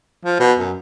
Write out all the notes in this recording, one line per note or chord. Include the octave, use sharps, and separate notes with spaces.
F3
B2
F#2